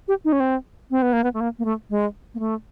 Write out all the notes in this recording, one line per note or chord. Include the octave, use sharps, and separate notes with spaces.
G4
D#4
C#4
C4
C4
B3
A#3
B3
A3
A#3
A#3
A3
G#3
A#3
A3